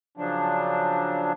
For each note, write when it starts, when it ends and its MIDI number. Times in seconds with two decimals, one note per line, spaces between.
0.18 1.32 49
0.18 1.32 53
0.18 1.32 54
0.18 1.32 62